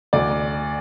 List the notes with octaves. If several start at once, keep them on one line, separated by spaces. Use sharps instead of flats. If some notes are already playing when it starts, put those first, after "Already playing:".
D2 D5